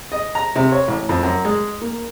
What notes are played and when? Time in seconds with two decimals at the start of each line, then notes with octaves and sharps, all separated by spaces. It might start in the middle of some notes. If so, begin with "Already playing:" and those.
0.12 D#5
0.35 A#5
0.56 C3
0.72 C#5
0.88 A1
1.09 F2
1.23 F#2
1.45 G#3
1.82 A#3